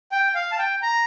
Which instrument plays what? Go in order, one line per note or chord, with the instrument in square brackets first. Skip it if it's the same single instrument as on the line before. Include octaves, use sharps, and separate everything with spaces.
[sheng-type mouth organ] G5
F5
A5
G5
A#5